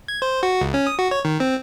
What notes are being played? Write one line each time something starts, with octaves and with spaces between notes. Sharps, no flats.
G#6
C5
F#4
C#2
C#4
D#6
F#4
C#5
D#3
C4